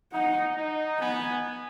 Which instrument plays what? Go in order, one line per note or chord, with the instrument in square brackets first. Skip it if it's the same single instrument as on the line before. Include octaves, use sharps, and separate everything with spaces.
[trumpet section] D#4 [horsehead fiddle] F#5
[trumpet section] D#4
[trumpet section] B3 [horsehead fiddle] G#5